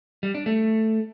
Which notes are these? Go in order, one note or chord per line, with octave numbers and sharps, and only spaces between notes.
G3
D4
A3